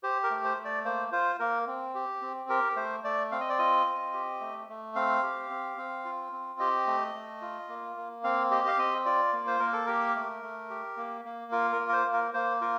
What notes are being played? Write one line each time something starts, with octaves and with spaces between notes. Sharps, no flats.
G4 C5
A#4
A3
C5
A3
D5
A#3 C5
F4 C5
A#3 A#4
C4
G4
C4
G4 A#4
A3 C5
A3 D5
C4 F5
D#5
D5
F4 D#5
C4
G4
A3
A3
C4 F5
G4
C4
C4
F4
C4
G4 D#5
A3
A3
F4
A#3
A#3
C4 F5
G4 D#5
F5
C4 D#5
F4 D5
A#3
C5
A#3 A#4
A4
G4 A#4
A3
A3
G4
A#3
A#3
F4 A#4
A#4
A#3
A#4
C5
A#3
A#4
A#3 C5
F4 A#4